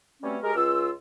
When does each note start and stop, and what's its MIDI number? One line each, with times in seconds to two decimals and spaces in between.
0.22 0.37 47
0.22 0.37 55
0.22 0.37 57
0.22 0.37 60
0.22 0.37 61
0.43 0.52 56
0.43 0.52 67
0.43 0.52 70
0.55 0.90 37
0.55 0.90 65
0.55 0.90 88